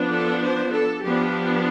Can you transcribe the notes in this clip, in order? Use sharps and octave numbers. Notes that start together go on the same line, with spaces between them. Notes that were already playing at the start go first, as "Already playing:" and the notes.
Already playing: F3 B3 D4
A4
C5
A4
F3 B3 D4 G4